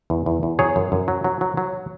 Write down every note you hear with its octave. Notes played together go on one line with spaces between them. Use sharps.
E2
E2
E2
F#3 G#4 C#5
F#2
F#2
F#3
F#3
F#3
F#3